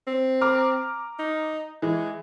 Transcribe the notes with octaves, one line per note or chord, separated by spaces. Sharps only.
C4
A#5 D6 F6
D#4
E3 G#3